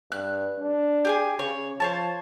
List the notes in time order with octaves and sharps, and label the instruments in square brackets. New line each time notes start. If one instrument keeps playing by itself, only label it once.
[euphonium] G2 [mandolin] F#6
[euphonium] D4
[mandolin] G4 G#4 G#5
[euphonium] C#3 [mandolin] C#5
[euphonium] F3 [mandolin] C5 C#5 A5